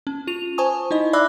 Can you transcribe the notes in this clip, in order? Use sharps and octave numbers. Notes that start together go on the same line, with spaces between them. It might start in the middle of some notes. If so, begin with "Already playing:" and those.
C#4
F4 D#7 F7
C5 G#5 A5 C#6 D#6
D#4 E4 D#5
D5 E5 B5 D6 E6 F#6